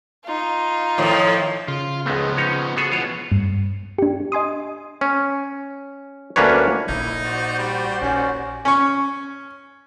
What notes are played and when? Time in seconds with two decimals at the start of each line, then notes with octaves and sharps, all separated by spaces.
0.25 D#4 F4
0.98 A2 D#3 F3
1.68 C#3 F4
2.06 C#2 F3 G#3 A3 B3
2.37 C#4 D#4 C#5
2.77 B3 F#4 G#4 A4
2.92 B2 E3 F4 C#5
3.32 G2
3.98 D4 G4
4.32 D#5 G#5 C6 D#6
5.01 C#4
6.36 D2 A#3 C#4 D4 B4 C#5
6.88 A#1 A#2 D#4 E4
7.23 F#4 C5 D5
7.59 G3
8.02 A#1 D#2 C#4
8.65 C#4 C#6